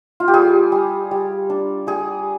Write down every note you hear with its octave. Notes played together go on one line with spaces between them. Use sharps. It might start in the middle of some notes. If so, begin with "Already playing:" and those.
F4
G4
G3 G#4
G3
G3
D4
G3 G#4